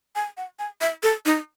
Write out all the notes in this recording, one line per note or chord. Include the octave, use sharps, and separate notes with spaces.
G#5
F#5
G#5
E5
A4
D#4